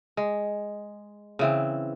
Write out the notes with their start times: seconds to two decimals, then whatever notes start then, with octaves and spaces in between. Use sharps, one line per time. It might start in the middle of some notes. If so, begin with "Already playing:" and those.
0.17 G#3
1.39 C#3 E3 C4